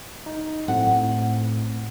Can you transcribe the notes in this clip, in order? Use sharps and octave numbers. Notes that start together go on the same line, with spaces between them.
D#4
A2 A3 C4 F#5